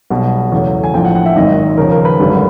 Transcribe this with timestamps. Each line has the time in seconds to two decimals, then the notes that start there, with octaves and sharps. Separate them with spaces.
0.10 B1 B2 G3 F#5
0.52 E2 C#3 F#3 A3
0.84 G#5
0.93 A#1 A2 F3 G5
1.05 F#5
1.15 F#5
1.26 E5
1.36 G#1 F#2 D#3 D#5
1.77 D#2 C#3 F3 A#4
1.92 A#4
2.05 B4
2.19 G#1 F#2 D3 G3